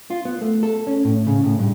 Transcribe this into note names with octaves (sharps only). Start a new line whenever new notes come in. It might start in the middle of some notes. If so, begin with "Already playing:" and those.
F4
B3
A3
A4
C#4
A2
C#3
A2
G2